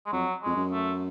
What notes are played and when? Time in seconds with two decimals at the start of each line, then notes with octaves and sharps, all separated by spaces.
0.06 G#3
0.12 F2 F#3
0.43 F2 G#3
0.56 F#2
0.71 A3